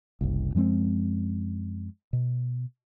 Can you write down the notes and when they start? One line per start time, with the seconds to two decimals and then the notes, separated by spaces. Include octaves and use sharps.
0.21 F#1 C2
0.55 F#2 F3 G#3 C4
2.13 B2